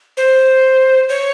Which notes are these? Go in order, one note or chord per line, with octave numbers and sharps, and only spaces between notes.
C5
C#5